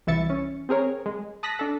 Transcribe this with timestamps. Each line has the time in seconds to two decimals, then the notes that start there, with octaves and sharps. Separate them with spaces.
0.07 C2 E3 E4 E5 A6 C#7
0.30 C#4
0.69 C4 G#4 A#4 C#5
1.06 G#3
1.43 A5 D#6 F#6 A#6 B6
1.59 D4 A4